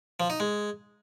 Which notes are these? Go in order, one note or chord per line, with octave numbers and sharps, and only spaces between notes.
F3
D#4
G#3